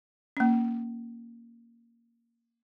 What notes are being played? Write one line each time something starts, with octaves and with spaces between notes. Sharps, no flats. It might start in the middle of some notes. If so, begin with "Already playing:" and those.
A#3 C#4